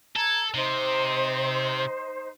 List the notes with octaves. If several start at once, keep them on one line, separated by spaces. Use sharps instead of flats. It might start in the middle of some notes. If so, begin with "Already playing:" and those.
A4 A#5 G#6
C3 D#4 C5